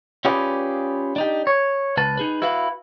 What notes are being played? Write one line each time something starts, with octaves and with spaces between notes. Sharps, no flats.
C#4 F4 G4 G#4 B4 D5
D4 D#4 G4
C#5
C#2 B4 A5
D#4 G#4 B4
E4 F#4 B4 F5